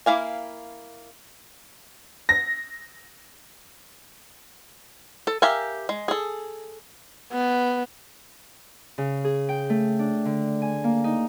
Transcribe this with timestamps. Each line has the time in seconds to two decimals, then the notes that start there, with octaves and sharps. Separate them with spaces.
0.06 A#3 E4 F5 G#5
2.29 A#6
5.27 A4
5.42 G4 A#4 E5 F5 G#5
5.89 G#3
6.08 G#4 A4
7.32 B3
8.98 C#3
9.24 G#4
9.49 G5
9.70 A3
9.99 D4
10.25 D3
10.62 G#5
10.84 A#3
11.04 D#4